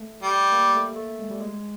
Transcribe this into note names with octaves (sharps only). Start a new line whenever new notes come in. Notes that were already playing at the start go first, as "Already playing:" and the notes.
Already playing: A3
G3
A#3
A3
A3
G#3
G3
G#3